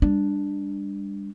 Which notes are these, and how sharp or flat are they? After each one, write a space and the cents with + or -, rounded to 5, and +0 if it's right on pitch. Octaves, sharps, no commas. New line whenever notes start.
G3 +35 D4 +0